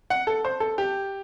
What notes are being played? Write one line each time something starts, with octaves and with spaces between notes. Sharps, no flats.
F#5
A4
C5
A4
G4